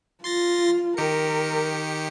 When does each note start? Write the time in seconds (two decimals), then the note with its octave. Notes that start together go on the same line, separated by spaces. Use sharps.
0.24 F4 C6 A6 A#6
0.97 D#3 G4 A#4 C#7